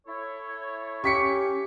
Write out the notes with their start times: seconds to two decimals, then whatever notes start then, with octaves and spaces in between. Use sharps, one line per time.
0.07 E4 A4 C#5
1.04 C#4 G4 C#6 B6 C#7